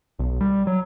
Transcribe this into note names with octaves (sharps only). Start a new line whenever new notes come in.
B1
G3
F#3